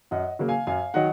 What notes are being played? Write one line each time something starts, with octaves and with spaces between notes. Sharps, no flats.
F#2 D#5 F#5
C#3 F#3 A#3
F5 G#5
F#2 F5 G#5
D#3 F#3 D#5 F#5